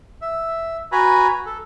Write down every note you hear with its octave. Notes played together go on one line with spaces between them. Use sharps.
E5
F#4 B4 G#5 A#5 B5
A4